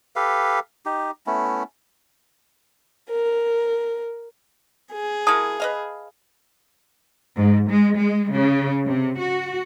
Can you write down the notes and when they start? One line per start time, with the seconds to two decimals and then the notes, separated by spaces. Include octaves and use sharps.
0.16 G4 A4 B4 F5
0.86 D#4 G4
1.27 A3 B3 C#4 E4
3.11 A#4
4.93 G#4
5.27 A#3 E4 F#4 A5 D#6
5.60 B4 D#5 F5
7.36 G#2
7.69 G#3
8.00 G#3
8.32 C#3
8.86 C3
9.19 F#4